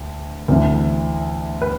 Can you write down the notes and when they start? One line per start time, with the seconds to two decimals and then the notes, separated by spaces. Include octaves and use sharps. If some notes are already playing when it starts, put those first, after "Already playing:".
Already playing: D2
0.48 D2 C3 E3
1.62 B4